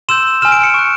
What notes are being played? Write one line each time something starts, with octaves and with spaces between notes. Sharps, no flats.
C6 E6 G6 E7
G#5 C6 F6 E7
D7
C#7
C#6 F#6